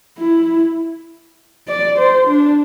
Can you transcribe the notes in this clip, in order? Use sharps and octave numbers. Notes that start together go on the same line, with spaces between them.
E4
D5
C5
D4